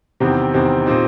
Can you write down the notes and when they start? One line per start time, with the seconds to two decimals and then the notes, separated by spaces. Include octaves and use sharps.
0.20 E2 C3 D#3 G3 C4
0.54 E2 C3 D#3 G3 C4
0.86 A#2 G3 C4 D#4